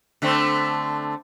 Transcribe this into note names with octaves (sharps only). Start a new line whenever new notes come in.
D3 A3 C4